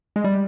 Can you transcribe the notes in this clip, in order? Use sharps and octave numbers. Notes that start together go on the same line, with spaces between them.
G#3
G3